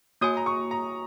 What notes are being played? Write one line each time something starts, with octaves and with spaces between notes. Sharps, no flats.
A#3 F#4 C#5 G#5 D#6
A#5
C#6
A#5